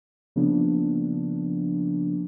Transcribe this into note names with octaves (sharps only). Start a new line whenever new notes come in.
C#3 F3 A#3 B3 D4